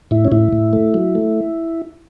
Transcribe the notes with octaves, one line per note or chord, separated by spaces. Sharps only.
A2 E4
C#4
A2 E4
A2
A3
F#3
A3